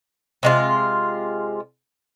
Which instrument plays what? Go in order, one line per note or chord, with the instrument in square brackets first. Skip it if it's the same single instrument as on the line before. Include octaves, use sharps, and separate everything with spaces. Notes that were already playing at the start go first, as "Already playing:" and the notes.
[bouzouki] C3 G#3 F4